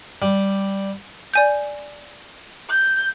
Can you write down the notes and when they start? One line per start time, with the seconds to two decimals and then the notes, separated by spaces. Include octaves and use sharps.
0.22 G3
1.34 D5 G#5 G6
2.69 G6